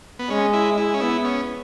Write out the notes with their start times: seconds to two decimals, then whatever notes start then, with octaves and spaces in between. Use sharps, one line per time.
0.19 B3
0.30 G#3 C#4
0.53 E4
0.77 E4
0.94 C#4
1.01 B3 E4
1.25 C#4